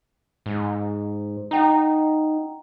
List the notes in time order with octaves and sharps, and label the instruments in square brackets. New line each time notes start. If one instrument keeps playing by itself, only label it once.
[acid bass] G#2
[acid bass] D#4 [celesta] F#5 G5 A#5